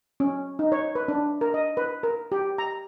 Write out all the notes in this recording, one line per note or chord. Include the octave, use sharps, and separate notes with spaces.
C#4
D#4
C#5
B4
D4
A#4
D#5
B4
A#4
G4
A#5